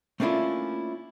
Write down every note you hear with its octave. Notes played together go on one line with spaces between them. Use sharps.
A3 A#3 C#4 D4 E4 F4